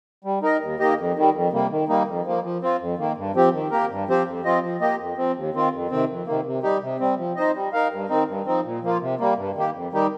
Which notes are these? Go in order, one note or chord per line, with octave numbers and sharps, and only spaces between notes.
G3
D#4 A#4 D#5
D#2
D#3 A#3 G4 D#5
F2
D#3 G3
F2
C3 G3 A#3
D#3
G3 A#3 D#4
F2
F3 A#3
F3
C4 F4
F2
D#3 A#3
G2
F3 C4 G4
D#3
A#3 G4 A#4
G2
F3 C4 G4 C5
F2
F3 C4 F4 D#5
F3
A#3 G4 D#5
F2
F3 C4
D#2
D#3 C4 F4
F2
C3 D#3 C4
F2
C3 D#3 A#3
C3
G3 D#4 G4
C3
G3 C4
F3
D#4 C5 D#5
G3
D#4 A#4 F5
G2
D#3 C4 D#4
G2
F3 C4 D#4
A#2
F3 A#3 F4
C3
G3 A#3
G2
D#3 A#3 G4
F2
D#3 G3 D#4 G4